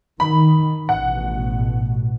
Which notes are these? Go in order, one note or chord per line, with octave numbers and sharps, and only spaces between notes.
D#3 B5
A1 B2 F#5